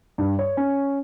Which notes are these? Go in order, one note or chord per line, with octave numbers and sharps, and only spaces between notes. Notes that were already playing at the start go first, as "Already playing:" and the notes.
G2
C#5
C#4